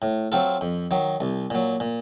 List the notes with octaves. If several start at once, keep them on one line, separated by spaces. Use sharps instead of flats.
A2
F#3 C4 F4 A4
F2
D#3 F#3
C2
A#2 F#3
A#2